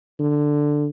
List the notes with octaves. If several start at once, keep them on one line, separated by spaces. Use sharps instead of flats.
D3